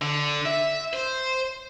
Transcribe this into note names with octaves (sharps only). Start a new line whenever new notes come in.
D3
E5
C5